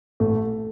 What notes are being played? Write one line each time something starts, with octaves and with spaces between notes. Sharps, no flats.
A1 A3